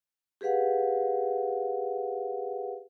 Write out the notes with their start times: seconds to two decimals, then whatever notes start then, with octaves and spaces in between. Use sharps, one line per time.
0.41 G4 G#4 B4 F5 F#5